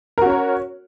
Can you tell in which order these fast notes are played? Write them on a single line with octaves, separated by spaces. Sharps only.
A#4 F#4 C#4 C#5